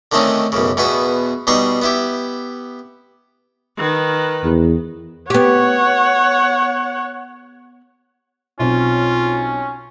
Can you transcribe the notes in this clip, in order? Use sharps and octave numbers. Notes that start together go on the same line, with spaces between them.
D3 D#3 A3 C4 C#4 D#4
B1 F#2 C#3
E2 B2 B3 F#4 B4
B2 G3 D#4 C6 C#6
B3 E4 G4
D#3 B4
E2
B3 G4 C#5 F#5
B1 C4 C#4 F4